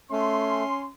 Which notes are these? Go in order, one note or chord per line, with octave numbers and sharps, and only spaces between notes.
A3 C#4 C6